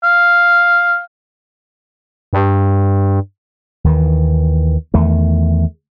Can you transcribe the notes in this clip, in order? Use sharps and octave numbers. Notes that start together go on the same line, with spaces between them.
F5
G2
D#2 D#3 E3
E2 D#3 A3